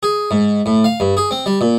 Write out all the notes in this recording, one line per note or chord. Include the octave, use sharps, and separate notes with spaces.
G#4
G#2
A2
F5
G2
G#4
C4
G3
A#2